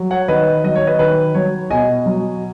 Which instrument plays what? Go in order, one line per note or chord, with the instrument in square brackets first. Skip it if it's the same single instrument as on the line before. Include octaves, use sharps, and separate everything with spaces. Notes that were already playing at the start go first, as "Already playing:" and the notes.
Already playing: [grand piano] F#3
C#5 F#5
D#3 B4 D#5
F#3 D#5
C#5
B4 D#5
D#3 B4
F#3 C#5
B2 D#5 G#5
F#3